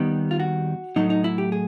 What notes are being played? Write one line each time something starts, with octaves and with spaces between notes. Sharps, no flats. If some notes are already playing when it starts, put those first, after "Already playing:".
Already playing: D#2 D#3 G3 B3
F4
F#4
A2 F#3 A3 D#4
D#4
E4
G4
G#4